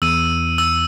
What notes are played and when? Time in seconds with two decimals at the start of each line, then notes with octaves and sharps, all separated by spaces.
0.02 E2 E6 D#7
0.58 E6